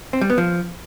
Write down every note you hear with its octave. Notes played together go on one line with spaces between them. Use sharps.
C4
G3
B3
F3